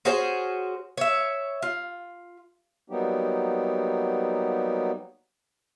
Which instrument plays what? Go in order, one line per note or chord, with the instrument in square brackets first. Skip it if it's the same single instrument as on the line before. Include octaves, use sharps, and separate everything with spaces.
[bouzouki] C#4 F#4 G#4 C5
C#5 E5
F4
[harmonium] F#3 G3 A#3 B3 D#4 G4